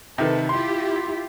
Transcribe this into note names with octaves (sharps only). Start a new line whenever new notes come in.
C3 D#3 A4 B4
E4 F4 G4 C6